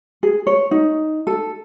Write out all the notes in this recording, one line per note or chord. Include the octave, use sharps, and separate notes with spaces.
G#4
C#5
D#4
A4